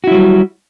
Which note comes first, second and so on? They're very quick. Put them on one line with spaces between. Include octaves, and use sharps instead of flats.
F#4 E4 F#3 G3